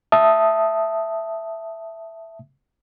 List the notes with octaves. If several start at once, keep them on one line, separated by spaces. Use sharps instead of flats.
E5 A5 D#6